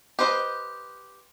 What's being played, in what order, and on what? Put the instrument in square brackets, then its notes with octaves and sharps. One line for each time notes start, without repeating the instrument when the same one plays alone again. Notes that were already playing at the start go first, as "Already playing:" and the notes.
[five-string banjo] G4 B4 C5 D#5